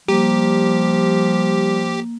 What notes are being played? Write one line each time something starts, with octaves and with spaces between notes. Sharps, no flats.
F3 G3 A#3 G4